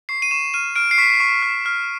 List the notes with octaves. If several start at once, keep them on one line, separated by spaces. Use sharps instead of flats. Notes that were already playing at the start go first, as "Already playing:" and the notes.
C#6 C7
D#7
C#6 E7
F6 D#7
F6 D7
C7
C#6 B6
C#6
F6
F6